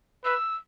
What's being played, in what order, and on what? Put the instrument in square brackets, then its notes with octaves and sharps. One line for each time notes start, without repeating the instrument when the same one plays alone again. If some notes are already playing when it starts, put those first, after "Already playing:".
[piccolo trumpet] B4 [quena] E6